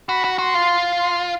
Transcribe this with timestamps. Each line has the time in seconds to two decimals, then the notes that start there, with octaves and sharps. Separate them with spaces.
0.09 F#4 B5
0.25 F#4
0.38 F#4 C6
0.54 F4
0.99 C6